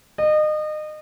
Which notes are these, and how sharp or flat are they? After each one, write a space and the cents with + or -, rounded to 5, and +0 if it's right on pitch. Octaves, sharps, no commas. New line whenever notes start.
D#5 -30